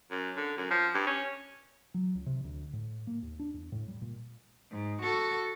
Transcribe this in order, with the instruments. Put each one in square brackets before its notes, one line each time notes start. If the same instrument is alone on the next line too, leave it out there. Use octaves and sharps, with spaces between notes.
[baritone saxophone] F#2
D3
F#2
F3
G2
C#4
[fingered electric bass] F#3
C#2
C3
D2
A2
A#3
D#2
D4
E2
A2
G3
A#2
[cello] G#2
F#4 A4